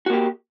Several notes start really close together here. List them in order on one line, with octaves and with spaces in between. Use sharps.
F#4 A#3 G4